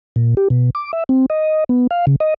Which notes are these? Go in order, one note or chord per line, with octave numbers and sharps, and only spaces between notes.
A#2
G4
B2
D6
E5
C4
D#5
B3
F5
C#3
D#5